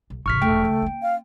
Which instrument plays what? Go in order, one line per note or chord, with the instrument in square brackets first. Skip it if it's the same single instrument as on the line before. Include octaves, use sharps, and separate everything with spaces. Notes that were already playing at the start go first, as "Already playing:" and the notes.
[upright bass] B1
[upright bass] A1 C#3 [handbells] C#6 F6 B6
[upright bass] E1 A#1 [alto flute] A3 [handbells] G5
[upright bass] C#2
A#3 C#4
[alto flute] F5